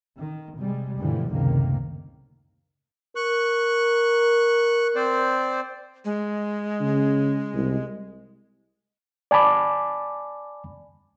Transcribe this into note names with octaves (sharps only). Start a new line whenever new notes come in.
D#3
C3 G3 G#3
D2 G2 B2 D3 E3 F3
F#1 C#2 A2 C3 D#3 A#3
A#4 C#6 F#6
C4 C5 D5
G#3
C#3
C2
D5 G#5 A5 B5 D6